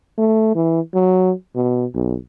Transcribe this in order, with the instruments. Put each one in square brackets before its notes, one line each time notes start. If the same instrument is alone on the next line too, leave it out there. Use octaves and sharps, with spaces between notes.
[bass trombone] A3
E3
F#3
B2
B1